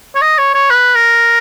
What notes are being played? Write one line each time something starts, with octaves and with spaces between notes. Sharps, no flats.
C#5
D#5
C#5
C#5
B4
A#4